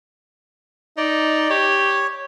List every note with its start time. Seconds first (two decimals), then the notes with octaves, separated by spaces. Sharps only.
0.97 D#4 D5
1.50 G4 C#5